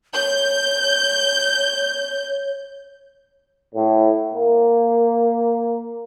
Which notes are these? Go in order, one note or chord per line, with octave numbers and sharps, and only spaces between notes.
C#5 G6
A2
A#3